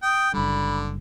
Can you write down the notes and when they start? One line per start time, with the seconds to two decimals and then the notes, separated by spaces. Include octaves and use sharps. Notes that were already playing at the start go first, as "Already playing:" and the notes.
0.03 G5 D#6
0.34 F#1 D3 G3 B5